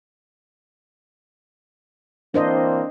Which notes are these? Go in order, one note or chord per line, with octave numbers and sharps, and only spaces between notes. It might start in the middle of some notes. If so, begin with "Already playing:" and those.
E3 A#3 C4 D4 C5 D#5